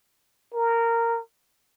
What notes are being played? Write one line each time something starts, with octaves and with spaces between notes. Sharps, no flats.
A#4